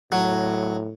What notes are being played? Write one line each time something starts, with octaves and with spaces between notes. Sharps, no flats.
A2 F#3